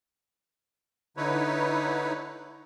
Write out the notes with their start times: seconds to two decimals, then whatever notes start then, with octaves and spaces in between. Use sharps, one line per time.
1.17 D3 D#4 E4 B4 C#5